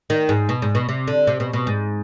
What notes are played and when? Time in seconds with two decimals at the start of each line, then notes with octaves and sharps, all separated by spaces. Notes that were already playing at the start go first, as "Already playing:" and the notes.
0.10 D#3
0.29 G#2
0.49 B2
0.62 G#2
0.75 B2
0.89 C3
1.07 D3
1.27 C3
1.40 B2
1.53 B2
1.67 G#2